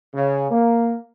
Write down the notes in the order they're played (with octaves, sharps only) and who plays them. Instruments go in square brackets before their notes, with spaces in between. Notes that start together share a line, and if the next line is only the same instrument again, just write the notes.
[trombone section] C#3
A#3